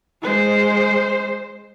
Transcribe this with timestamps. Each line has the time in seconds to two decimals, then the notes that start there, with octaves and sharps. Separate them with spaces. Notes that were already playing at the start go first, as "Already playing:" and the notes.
0.22 G#3 C5